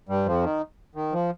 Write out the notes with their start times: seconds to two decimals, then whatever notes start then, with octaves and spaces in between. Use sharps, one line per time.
0.09 G2 G3
0.26 F2 F3
0.44 D#3
0.95 D#3
1.12 F3